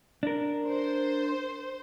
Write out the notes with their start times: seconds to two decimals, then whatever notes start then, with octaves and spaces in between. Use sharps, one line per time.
0.23 D4 A#4
0.68 C5